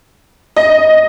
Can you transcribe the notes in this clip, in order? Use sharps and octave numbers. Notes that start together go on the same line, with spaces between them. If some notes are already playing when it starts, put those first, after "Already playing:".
D#5